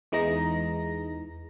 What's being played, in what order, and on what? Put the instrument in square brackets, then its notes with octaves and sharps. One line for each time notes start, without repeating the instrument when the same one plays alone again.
[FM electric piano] E2 E3 G#3 D#4 A#5 A#6